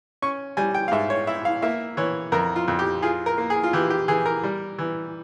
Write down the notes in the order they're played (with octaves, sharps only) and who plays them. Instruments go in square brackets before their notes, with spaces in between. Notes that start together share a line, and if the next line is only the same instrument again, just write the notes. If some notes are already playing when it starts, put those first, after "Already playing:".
[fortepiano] C#4 C#6
G3 G#5
G5
F5
G#2 E5
C#5
E4 E5
F5
A#3 E5
E3 C#5
F2 A#4
F4
F2
G4
F4 G#4
A#4
A#3
G#4
F4
E3 G4
G4
E3 G#4
A#4
G3
E3